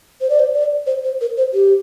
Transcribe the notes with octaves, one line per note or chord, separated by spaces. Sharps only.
C5
D5
C5
D5
C5
C5
A#4
C5
G4